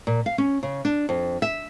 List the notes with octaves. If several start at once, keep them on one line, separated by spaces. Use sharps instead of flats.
A#2
F5
C#4
C#3
D4
F2
E5